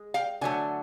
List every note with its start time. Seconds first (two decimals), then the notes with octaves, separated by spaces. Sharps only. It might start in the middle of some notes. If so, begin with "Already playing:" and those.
Already playing: G#3
0.14 F5 G5
0.41 D3 F#3 A3 G#5